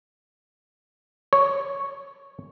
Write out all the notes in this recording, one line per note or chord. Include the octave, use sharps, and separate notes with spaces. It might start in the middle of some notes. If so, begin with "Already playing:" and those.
C#5